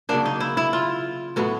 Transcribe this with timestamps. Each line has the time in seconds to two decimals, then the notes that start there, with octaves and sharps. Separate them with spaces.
0.09 C#3 F#3 A#3 D4
0.25 D#4
0.40 E4
0.57 E4
0.73 F4
1.36 A2 F#3 B3